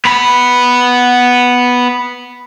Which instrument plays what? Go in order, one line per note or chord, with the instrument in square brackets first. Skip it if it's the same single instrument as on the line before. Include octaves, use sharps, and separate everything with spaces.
[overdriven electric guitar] B3 B5